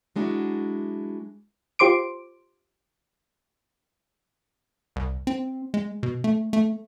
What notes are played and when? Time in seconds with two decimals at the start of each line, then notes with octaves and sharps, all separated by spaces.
0.16 F#3 G#3 D4 E4 F#4
1.79 F4 G4 C5 C6 D6 D7
4.96 C2
5.27 C4
5.74 G#3
6.03 B2
6.24 A3
6.53 A3